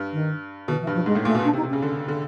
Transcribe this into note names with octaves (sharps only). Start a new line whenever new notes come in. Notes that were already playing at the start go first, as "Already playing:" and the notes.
Already playing: G2
D#3
B2 D#3
E3
G2
F3
G#2 G#3
A2
A#2 A3
B2
D4
C3
D#4
C3
C#3 C#4
D3
D3